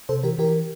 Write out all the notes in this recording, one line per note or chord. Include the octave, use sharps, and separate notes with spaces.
C3 A4 C5
E3 G4 A#4
E3 G4 A#4